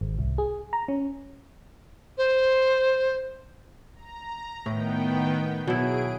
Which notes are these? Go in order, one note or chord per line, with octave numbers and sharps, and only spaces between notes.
G#1
C2
G#4
A#5
C#4
C5
A#5
A2 D#3 B3 G5
B2 F#3 E4 G#4 D7